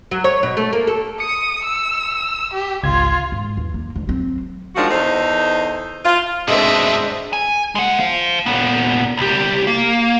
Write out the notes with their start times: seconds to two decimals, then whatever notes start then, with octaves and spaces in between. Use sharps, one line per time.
0.11 F#3
0.24 C#5
0.43 B2
0.57 A3
0.73 A#3
0.87 A4
1.20 D#6 C#7
1.65 E6
2.54 G4
2.83 G#1 C#2 F4 G#6
3.32 G#2
3.57 E2
3.74 A#3
3.96 D2
4.07 F#3 C4
4.76 D#3 F3 G#3 D4 F#4
4.90 E2 D#4 A4 C5
6.05 F4
6.48 G#2 B2 G#3 C4 D4 D#5 E5
7.33 G#5
7.75 G#3 F#5
8.00 C5 F5
8.46 A#2 B3
9.17 C2 G4
9.67 A#3